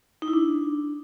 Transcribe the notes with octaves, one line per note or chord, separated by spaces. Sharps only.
D#4
E4
D4